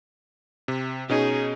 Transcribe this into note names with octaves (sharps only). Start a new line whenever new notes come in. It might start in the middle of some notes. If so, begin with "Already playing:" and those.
C3
B2 C#4 D#4 G#4